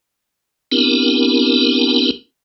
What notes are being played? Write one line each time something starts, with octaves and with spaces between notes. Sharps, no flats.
B3 C4 D4 E4 G4 A#4